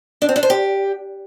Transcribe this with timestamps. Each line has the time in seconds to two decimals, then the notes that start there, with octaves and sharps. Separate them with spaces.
0.22 D4
0.29 C4
0.36 D4
0.43 C5
0.50 G4